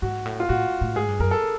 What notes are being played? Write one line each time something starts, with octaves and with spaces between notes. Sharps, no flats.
G#2 F#4
A2
F4
A2 F#4
A2
G#2 G#4
G2
F#2 A#4
A4